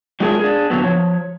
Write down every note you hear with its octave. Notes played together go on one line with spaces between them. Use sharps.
F#3 G#3 D4 F4 G#4 A#4
D4 G#4
A#2 D3 F#3 B3
F3 C#5